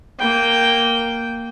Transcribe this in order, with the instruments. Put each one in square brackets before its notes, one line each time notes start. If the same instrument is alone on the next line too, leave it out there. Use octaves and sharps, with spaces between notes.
[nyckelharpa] A#3 G5